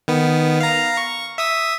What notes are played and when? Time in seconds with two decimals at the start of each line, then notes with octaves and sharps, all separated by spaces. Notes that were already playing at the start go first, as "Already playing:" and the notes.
0.08 D#3 B3
0.60 F5 A#5
0.97 C#6
1.38 E5 D#6 E6